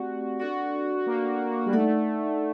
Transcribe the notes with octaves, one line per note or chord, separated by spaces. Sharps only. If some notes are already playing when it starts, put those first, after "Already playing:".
Already playing: A3 C4 F#4 G4 D5 F#5
D4 F#4 A4 D5
A#3
G3
A3 D#4 A4 D5 F#5